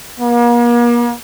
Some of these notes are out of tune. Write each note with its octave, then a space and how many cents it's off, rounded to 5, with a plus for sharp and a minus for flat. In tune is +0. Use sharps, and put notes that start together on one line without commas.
A#3 +40